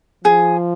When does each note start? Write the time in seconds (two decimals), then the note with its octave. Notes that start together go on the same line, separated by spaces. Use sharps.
0.24 F3 G#4